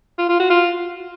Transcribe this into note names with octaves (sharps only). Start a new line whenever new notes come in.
F4
F4
F#4
F4